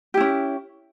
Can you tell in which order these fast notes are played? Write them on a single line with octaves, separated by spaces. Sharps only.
G4 E4 C#4